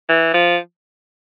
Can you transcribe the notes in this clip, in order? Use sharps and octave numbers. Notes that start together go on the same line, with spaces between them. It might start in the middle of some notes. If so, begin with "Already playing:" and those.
E3
F3